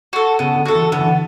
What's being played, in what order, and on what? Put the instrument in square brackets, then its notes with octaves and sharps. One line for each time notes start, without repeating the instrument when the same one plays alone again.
[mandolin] F#4 A4
[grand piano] C#3 [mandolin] B3
[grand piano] D3
[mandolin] F#4 A4
[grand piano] E3
[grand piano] D3 [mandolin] B3
[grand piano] E3
D3